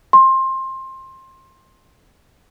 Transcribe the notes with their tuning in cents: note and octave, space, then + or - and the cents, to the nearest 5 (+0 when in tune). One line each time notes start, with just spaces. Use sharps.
C6 +20